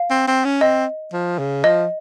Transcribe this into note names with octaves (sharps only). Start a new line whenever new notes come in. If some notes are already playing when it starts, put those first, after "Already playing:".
Already playing: F5
C4
C4
C#4
C4 D#5
F3
C#3
F3 D#5